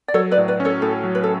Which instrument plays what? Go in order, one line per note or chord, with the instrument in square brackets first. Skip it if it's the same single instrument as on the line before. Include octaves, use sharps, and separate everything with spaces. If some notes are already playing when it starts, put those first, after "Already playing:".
[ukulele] D5
[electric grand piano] F#3 [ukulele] A4 C#5
[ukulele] B4 D5
[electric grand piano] A2
[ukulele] B4 D5
[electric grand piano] C#4
[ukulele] A4 C#5
[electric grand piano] A2 [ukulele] A4
[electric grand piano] F#3
[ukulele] B4
A4